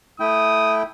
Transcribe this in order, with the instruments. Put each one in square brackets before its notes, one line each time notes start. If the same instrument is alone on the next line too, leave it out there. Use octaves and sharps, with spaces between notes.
[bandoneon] A3 E4 G5 [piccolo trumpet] D#6